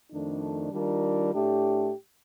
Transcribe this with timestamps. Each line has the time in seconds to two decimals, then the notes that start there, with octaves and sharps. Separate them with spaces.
0.11 F2 D#3 A3 D4
0.72 D#3 G3 D4 F4 A#4
1.32 A2 A3 D4 G4